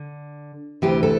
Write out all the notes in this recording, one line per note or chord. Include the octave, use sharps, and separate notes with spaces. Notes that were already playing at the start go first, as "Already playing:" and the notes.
Already playing: D3
D2 C3 E3 G4
A4